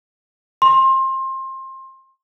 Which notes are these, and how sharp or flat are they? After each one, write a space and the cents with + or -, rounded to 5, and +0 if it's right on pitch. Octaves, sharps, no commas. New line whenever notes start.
C6 +25